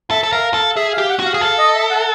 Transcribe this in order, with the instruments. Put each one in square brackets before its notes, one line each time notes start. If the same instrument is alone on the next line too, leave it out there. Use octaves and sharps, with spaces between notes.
[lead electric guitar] A4 [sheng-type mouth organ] E5
[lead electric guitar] A4
[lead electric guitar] A#4 [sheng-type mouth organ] F5
[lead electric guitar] A4 [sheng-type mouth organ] F5
[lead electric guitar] G#4 [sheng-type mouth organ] E5
[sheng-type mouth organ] F5
[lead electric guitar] G4
[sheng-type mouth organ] F#5
[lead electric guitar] F#4
[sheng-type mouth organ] F5
[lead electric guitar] G#4
[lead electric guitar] A4 [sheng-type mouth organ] F5
[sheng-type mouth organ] D#5
E5
F#5